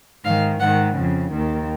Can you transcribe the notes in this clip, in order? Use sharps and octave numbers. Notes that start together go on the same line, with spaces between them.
G#2 D#3 F5
G#2 D#3 F#5
F2 C#3
D#2 D#3